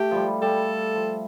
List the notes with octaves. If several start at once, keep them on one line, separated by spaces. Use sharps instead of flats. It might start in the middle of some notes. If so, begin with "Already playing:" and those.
Already playing: A3 G4
F3 G3
G3 A4
F3